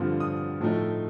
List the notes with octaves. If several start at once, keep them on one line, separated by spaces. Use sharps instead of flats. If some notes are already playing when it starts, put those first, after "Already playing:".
Already playing: G2 D3 F3 C4 F4
D#6
A2 F3 A3 D#4